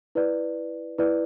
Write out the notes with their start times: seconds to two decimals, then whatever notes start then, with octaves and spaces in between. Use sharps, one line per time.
0.15 E4 B4 D5
0.98 E4 B4 D5